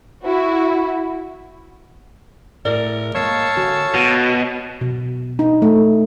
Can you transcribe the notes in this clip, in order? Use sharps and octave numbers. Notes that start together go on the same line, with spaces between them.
E4 F#4
A2 G#4 A#4 D5
G#3 A#3 C#5 F5 A5 E6
D3 F#4 G#5
B2 F#4
B2
D#4
A3